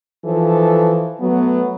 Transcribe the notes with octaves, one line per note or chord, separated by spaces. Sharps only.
E3 F3 D#4 A4
F#3 A3 B3